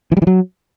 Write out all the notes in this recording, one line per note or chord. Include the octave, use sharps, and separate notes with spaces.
E3
G3
E3
F#3